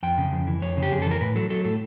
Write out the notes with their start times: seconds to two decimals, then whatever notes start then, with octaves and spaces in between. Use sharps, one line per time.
0.03 F2 G5
0.18 C#3
0.32 F2
0.47 E3
0.62 F2 C#5
0.77 C#3
0.83 G4
0.92 F2 G#4
1.02 A4
1.06 E3
1.11 A#4
1.21 A2 B4
1.36 F#3 A4
1.50 F#3 A4
1.65 A2 A4